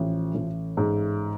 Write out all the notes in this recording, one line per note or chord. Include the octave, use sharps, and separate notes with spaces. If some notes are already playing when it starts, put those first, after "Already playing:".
Already playing: A1 F3
A1
G#2